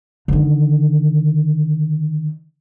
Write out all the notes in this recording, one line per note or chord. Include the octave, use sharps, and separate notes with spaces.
D3 D#3